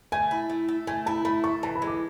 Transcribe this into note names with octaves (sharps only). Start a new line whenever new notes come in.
A3 G#5
E4
A3
A4
A3 G#5
E4 A5
A3 B5
A4 C#6
E3 A5
B5
G#3
D6